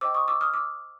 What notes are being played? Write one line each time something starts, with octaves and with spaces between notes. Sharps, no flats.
C5 D#5 G5 D6 E6
C#6 D#6
D6 E6
D#6 F6
D6 E6